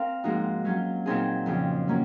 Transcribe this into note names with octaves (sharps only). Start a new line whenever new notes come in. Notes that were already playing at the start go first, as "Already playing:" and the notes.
Already playing: C4 A#4 F5
G#2 F3 A#3 D#4 F#4
F#3 C#4 F4
A#2 F#3 C4 D#4 G#4
F2 C#3 F3
F#3 A#3 C#4